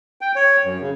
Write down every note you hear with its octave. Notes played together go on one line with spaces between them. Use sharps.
G5
C#5
F#2
C#3